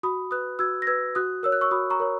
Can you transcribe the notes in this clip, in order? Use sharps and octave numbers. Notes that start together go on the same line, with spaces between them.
F#4 B5 D#6
B4 D#6 F#6
F#4 E6 G#6
A#6
B4 E6 G#6
F#4 D#6 F#6
A#4 C#5 E6
F#6
C#6 E6
F#4 B5 D#6
A#5 C#6
A#4 C#5